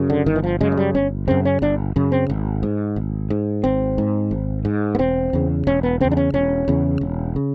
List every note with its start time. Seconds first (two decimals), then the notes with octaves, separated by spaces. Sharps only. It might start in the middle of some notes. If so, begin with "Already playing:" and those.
Already playing: F#2 C#3
0.10 D3
0.26 G1 D#3
0.36 E3
0.44 F3
0.61 F#2 C#3 G#3
0.72 G#3
0.77 G3
0.95 G1 C#4
1.28 F#2 C#3 C4
1.45 C#4
1.62 G1 D4
1.96 F#2 C#3
2.12 C4
2.30 G#1
2.63 G#2
2.96 G#1
3.30 G#2
3.64 G#1 C4
3.98 G#2
4.31 G#1
4.65 G#2
4.95 B3
4.99 E1 C4
5.33 E2 C#3
5.67 E1 C#4
5.83 B3
6.01 E2 C#3 C4
6.11 D4
6.17 C#4
6.34 E1 C#4
6.68 E2 C#3
7.01 E1
7.36 C#3